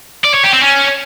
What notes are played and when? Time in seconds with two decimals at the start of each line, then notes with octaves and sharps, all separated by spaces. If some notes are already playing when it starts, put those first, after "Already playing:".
0.25 D5
0.34 C#5
0.44 G4
0.54 C4
0.63 C#4